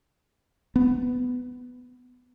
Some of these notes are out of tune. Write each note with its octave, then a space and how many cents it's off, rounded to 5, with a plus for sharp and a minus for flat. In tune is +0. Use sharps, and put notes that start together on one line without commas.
B3 +10